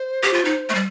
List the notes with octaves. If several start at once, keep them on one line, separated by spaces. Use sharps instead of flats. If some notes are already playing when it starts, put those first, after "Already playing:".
Already playing: C5
G4
F4
D#4
A3
G3